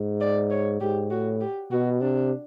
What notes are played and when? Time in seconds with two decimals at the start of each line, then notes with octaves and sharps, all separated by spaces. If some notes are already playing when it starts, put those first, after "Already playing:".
Already playing: G#2
0.21 D5
0.51 C#5
0.81 G#2 G4
1.11 A2 F#4
1.41 G4
1.71 B2 F#4
2.01 C3 D4